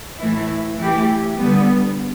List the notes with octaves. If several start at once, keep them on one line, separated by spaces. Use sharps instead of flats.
A2 E3 A3 E4
E3 A3 E4 G4
D3 G3 B3